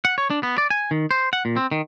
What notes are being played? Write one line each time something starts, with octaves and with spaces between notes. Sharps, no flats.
F#5
C#5
D4
B3
D5
G#5
D#3
C5
F#5
A#2
C4
D#3